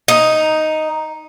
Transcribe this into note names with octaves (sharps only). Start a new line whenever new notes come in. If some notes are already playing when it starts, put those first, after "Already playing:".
D#4